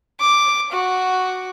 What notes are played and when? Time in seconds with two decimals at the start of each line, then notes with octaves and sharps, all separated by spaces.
0.21 D6
0.72 F#4